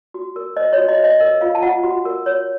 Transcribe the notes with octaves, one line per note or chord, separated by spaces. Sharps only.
F#4
A#4
C5 D#5
C#5
F#4
D#5
C5 D#5
A#4 D#5
F4 F5
A5
F4 F#5
F#4
A#4
C#5